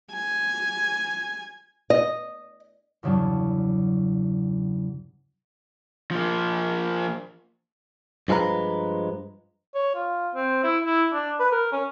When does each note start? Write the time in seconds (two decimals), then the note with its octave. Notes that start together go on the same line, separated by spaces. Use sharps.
0.13 G#5
1.90 D#5
3.03 E2 G2 C#3 F#3 D4
6.11 F3 A#3
8.28 G2 F3 G#3 A4 B4 A#5
9.75 C#5
9.95 F4
10.34 C4
10.64 E4
10.85 E4
11.13 D4
11.40 B4
11.52 A#4
11.72 C#4